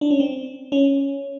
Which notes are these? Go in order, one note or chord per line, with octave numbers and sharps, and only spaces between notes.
D4
C#4
C4
C#4